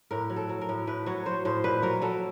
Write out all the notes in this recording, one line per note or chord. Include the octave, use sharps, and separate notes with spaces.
A2 A#4
F#3
A4
F#3
A#4
A2
A2 B4
F#3 C#5
F#3 C5
A2 C5
A#2 B4
F#3 A#4
F#3 A4